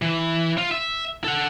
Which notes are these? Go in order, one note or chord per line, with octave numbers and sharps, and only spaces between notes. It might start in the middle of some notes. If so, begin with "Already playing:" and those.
E3
F4
E5
A4 F#5